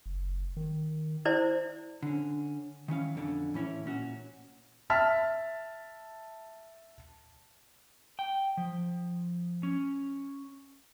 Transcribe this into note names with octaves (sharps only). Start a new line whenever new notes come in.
F#1
D#3
E4 C5 D5
D3 C#4
D#3 E3 C#4 F5
F2 B2 D3 C#4
A2 E3 C#4 E4 C#5
A#2 C#4 F#4
E5 A5 F6 B6
G5
F3
C#4